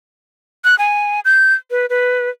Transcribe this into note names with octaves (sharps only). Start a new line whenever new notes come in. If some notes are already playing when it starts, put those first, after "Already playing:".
F#6
G#5
G6
B4
B4